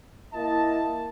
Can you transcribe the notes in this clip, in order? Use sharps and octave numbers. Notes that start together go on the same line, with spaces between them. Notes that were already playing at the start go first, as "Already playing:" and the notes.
A#3 E4 D#5 A5